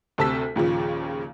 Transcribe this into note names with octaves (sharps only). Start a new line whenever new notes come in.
D2 C3 A5 E6 B6
D#2 A#2 C#3 F3